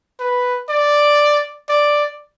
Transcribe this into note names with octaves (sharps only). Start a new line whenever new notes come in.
B4
D5
D5